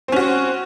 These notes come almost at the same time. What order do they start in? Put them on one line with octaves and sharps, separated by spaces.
C4 C#4 F#4